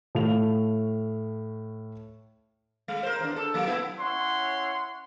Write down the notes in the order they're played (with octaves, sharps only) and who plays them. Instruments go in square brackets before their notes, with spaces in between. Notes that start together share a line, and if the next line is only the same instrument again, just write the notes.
[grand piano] A2 A3 F5 F7
[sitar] G#3
A#4 C5
E2 D4
A4
F#3 A#3
A3 B3 E4
[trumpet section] C#4 E4 C#5 F#5 C6